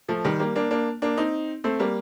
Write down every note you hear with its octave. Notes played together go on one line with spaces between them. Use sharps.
F3 A3
D#3 G3
G3 A#3
A#3 D4
A#3 D4
A#3 D4
C4 D#4
A3 C4
G3 A#3